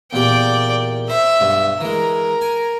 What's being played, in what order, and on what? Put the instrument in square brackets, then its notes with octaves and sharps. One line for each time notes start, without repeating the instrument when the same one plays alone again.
[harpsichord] E2 A#2 G4 [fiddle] D5 G5
[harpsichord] C5 [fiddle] E5
[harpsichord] B1 G2
[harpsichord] E3 G#3 [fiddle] A#4
[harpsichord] G#5